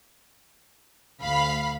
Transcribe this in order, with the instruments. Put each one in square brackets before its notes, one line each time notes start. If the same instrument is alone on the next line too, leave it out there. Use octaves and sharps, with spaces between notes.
[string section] D2 F5 B5